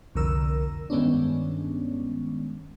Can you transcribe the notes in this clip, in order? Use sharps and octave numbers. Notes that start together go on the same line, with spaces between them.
C2 F2 D3 A#4 E6
G2 D#3 G#3 B3 C#4 D4